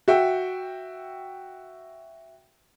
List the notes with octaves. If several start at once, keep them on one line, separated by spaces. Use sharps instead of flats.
F#4 E5 G5